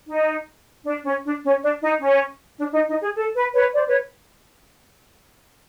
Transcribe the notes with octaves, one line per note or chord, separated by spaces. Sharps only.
D#4
D4
C#4
D4
C#4
D4
D#4
C#4
D4
D#4
D#4
G#4
A4
B4
B4 C#5
C5 D5
B4 C#5